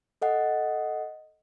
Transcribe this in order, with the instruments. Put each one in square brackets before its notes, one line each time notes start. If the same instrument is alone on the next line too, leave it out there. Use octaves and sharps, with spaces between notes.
[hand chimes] A4 D#5 F#5